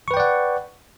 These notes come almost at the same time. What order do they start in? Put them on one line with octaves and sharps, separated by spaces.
C#6 B4 G5 D5 F#5